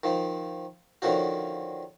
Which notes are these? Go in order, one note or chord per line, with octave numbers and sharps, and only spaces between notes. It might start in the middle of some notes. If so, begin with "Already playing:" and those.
D#3 F3
D3 D#3 F3 C#4 F#4